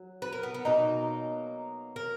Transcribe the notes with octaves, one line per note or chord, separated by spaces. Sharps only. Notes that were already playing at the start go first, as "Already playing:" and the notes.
Already playing: F#3
B4
A#4
B3
B3
B2 F#3 A#3 D#4
A#4